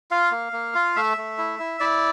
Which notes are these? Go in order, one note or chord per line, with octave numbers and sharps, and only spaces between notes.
F4 F5
A#3
A#3
F4
A3 E5
A3
E4
E4
E4 D5